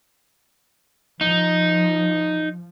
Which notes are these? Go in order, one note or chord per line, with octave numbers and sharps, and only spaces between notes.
F3 D#4